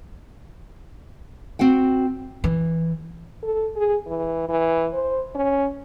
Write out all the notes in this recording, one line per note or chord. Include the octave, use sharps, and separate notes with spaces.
C4 F#4 F#5 G5
E3
A4
G#4
E3
E3
C5
C#4